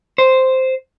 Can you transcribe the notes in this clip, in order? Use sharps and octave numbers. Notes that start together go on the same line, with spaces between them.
C5